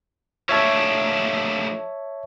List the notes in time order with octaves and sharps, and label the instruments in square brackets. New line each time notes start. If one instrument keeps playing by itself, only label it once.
[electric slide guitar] F3 A3 D4 [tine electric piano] C#5 E5 A5